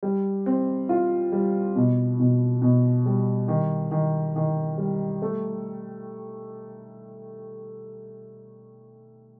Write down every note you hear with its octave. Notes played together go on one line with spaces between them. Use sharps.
G3
C4
F4
G3
B2
B2
B2
G3
D#3
D#3
D#3
G3
A3